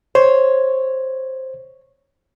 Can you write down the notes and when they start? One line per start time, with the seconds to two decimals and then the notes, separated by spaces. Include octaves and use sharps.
0.15 C5 C#5